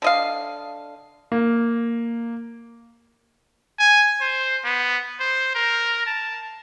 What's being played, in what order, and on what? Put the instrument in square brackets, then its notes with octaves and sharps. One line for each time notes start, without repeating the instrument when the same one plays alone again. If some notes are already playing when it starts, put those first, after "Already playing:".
[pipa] D3 D#5 F5
[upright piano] A#3
[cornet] G#5
C5
B3
C5
A#4
A5